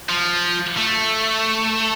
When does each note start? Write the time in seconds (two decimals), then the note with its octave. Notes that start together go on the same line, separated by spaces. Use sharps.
0.09 F3
0.77 A3